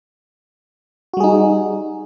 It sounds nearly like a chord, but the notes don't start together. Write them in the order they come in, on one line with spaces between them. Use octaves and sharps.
F#4 G3 G#4 D#4